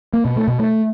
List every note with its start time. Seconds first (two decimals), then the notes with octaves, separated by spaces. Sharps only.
0.13 A#3
0.25 B2
0.36 A3
0.48 B2
0.59 A3